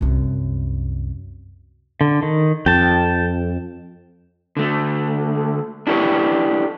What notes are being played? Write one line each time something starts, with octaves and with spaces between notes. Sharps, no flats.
C2 F#2
D3
D#3
F2 G5 A5
D3 A3
D4 E4 G4 A4 B4 C#5